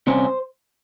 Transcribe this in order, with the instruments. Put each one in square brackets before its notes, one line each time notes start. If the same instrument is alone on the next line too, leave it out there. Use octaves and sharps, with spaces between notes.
[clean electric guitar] C2 C3 G3 C#4 C5